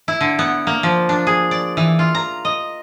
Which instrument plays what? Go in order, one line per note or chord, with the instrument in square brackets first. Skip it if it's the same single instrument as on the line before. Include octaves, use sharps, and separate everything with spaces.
[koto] E4
D3
B3
A#3
F3
D4
G#4
D5
E3
F4
A#5
D#5